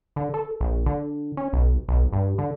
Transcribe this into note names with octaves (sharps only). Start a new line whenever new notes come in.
D3
A4
A#1
D3
C#4
B1
B1
G2
D3